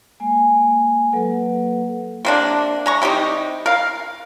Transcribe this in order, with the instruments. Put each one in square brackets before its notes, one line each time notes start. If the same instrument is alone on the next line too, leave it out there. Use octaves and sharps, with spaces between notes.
[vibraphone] G#3 A#3 G#5
F#3 A#3 A4 B4 F#5
[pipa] C3 A#3 D4
G#3 A#5 C#6
C3 G3 D#4 G4
A#4 F5